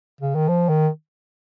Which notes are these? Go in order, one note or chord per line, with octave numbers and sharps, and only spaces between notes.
C#3
D#3
F3
D#3